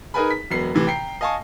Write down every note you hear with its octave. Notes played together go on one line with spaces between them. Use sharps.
D#4 G#4 A#4 B4 G#5 B5
B6
E1 F#3 B3 C7
A2 C3 E3
G5 A#5 C7
D#5 F5 G#5 A5 C#6